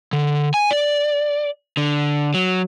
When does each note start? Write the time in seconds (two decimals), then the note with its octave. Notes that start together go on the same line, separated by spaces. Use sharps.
0.13 D3
0.54 G#5
0.71 D5
1.77 D3
2.34 F#3